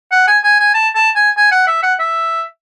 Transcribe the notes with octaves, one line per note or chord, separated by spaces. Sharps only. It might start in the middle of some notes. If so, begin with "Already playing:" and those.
F#5
G#5
G#5
G#5
A5
A5
G#5
G#5
F#5
E5
F#5
E5